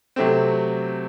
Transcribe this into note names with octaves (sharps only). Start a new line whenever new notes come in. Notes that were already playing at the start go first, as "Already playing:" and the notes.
C3 F#3 A3 C4